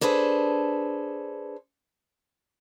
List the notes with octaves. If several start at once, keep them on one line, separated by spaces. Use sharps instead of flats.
D4 G#4 A4 B4 C5